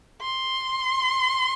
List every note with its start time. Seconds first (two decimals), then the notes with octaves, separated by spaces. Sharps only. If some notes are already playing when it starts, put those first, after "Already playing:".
0.22 C6